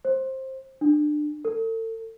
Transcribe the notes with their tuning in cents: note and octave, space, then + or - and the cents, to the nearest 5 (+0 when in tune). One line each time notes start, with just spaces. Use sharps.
C5 +15
D4 +25
A4 +40